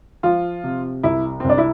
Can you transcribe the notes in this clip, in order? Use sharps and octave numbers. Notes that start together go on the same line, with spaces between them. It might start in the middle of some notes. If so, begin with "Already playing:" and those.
F3 F4
C3
C2 E4
C4
C2 D4
E4